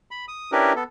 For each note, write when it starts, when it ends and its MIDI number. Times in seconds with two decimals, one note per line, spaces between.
0.11 0.25 83
0.28 0.51 87
0.52 0.73 61
0.52 0.73 62
0.52 0.73 64
0.52 0.73 67
0.52 0.73 70
0.52 0.73 71
0.76 0.83 59
0.76 0.83 69